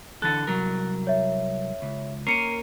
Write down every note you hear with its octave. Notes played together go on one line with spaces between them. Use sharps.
D3 E3 A4 F#6 A6
C2 F#3 A#4
C#5 E5
C#2
A#3 C#4 A#4 C7 C#7 D#7